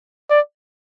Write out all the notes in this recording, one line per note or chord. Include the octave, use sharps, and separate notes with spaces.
D5